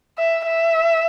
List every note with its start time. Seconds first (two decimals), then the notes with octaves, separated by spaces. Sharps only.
0.18 E5
0.46 E5